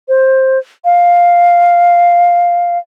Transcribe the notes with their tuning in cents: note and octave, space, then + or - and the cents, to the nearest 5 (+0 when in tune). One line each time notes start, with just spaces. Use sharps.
C5 +15
F5 +0